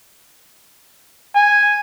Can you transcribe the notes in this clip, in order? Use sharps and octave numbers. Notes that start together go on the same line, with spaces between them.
G#5